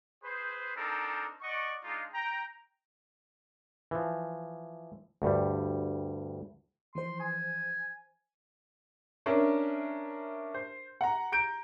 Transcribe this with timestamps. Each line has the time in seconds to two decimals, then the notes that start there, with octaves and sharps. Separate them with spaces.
0.24 G#4 B4 C5
0.76 C4 D4 D#4 A4 A#4
1.41 D5 D#5 F#5 C#6
1.84 G#3 D4 D#4 F4
2.14 G5 A#5
3.91 E3 F3
5.22 D2 G2 G3
6.95 E3 F3 C5 C6
7.20 G#5
9.26 C#4 D4 A#4 E5
10.54 C5
11.01 F#5 A#5
11.32 A#5 G6 D7